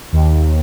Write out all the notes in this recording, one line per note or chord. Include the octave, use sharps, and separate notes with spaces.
D#2